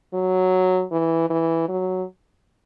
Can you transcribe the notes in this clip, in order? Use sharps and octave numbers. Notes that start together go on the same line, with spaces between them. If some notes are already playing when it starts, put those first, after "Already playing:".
F#3
E3
E3
F#3